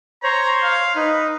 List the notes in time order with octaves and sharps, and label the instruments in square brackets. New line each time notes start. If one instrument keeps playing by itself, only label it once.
[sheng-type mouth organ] C5 C#5 [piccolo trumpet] A#5
[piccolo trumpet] F5
[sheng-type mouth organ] D#4 [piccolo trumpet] B4